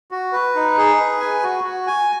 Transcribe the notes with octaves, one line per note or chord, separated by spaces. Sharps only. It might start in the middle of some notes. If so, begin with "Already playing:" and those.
F#4
B4
D#4
G#4
B4
G#5
F#4
F#4
G#5